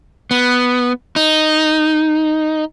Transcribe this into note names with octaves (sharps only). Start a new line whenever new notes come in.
B3
D#4